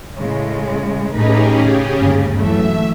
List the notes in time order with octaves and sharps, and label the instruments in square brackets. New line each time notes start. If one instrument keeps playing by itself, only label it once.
[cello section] A2 C#3 G#3
[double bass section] A2 A3 [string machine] C#4 G4 G#4 [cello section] D#4 B4
[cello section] C#3
[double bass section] G1 D#2 G#2
[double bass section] E3 F#3 A3 [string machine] E5